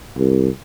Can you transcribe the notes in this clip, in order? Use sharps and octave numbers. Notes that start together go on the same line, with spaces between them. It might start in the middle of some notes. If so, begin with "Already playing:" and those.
C2